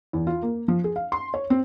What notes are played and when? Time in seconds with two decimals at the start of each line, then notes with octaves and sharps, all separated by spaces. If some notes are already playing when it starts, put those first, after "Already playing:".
0.13 E2
0.27 F4
0.43 A#3
0.68 F3
0.84 G#4
0.96 F5
1.12 C6
1.34 C#5
1.50 C4